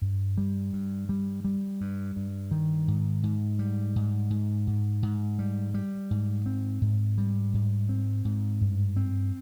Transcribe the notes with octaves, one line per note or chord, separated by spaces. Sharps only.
G2
G3
G2
G3
G3
G2
G2
D#3
G#2
G#2
G3
G#2
G#2
G#2
G#2
G3
G3
G#2
C4
G#2
G3
G#2
C4
G#2
G2
C4